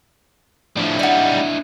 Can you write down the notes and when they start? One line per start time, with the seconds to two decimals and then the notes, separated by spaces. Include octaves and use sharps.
0.77 A2 F3 D4 E4
0.99 G3 D#4 D5 F#5